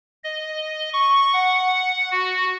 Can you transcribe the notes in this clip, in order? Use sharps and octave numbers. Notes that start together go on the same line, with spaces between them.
D#5
C#6
F#5
F#4